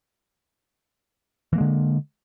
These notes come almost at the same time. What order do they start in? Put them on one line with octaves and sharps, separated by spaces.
E3 A#3 G#3 D3